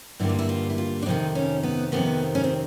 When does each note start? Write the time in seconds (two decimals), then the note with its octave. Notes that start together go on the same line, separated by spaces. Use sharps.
0.20 G2 D3 G3 A#3 E4
0.29 F4
0.39 E4
0.49 F4
0.70 E4
0.78 F4
1.02 D4
1.06 F2 C3 D#3 D#4
1.35 C#4
1.63 B3
1.92 F2 C3 D#3 B3
2.35 C#4
2.44 C4